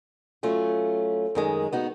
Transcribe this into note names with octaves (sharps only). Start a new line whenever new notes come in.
F#3 A3 C#4 F4
F#2 D#3 G#3
B3 D#4 F#4